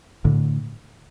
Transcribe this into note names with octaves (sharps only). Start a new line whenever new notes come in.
A2 D3